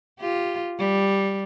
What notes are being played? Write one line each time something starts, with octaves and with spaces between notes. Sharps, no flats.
F4 G4
G3